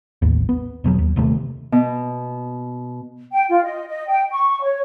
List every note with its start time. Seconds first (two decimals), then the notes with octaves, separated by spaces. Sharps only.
0.22 A1 D#2
0.49 B3
0.84 E1 B2 F#3
0.98 D#2
1.16 D#1 D#2 C3 A3
1.72 B2
3.32 G5
3.49 F4
3.64 D#5
3.87 D#5
4.08 G5
4.31 C#6
4.62 C#5